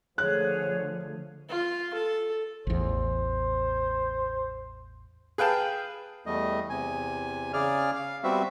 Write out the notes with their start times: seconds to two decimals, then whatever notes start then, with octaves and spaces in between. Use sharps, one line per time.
0.18 D3 F3 A3 G#4 C#5 F#6
1.49 F4
1.94 A4
2.67 A1 E2 C5
5.38 G#4 B4 F5 G5 A5
6.26 E2 G3 A3 D#5
6.70 E2 C3 G#5
7.53 C#3 G#4 D5 F6
7.95 F5
8.24 G3 B3 C4 F#4 E5